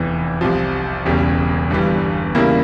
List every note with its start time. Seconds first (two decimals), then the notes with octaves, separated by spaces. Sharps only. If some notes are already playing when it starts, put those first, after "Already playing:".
Already playing: F1 E2 E3
0.41 C2 C3 F3
1.06 E1 E2 C#3 G3
1.70 G1 G2 E3 G3
2.35 E2 C#3 G3 A#3 E4